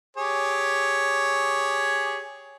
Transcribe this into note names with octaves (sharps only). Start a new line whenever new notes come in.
G4 G#4 C#5